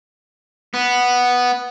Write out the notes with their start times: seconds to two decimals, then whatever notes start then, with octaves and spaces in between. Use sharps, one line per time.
0.74 B3